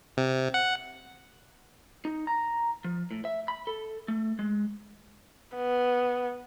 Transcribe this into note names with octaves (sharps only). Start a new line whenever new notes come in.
C3
F#5
D#4
A#5
F3
A2
E5
B5
A4
A3
G#3
B3